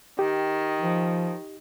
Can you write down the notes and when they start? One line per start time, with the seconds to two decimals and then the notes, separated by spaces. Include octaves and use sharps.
0.19 D#3 G4
0.82 F3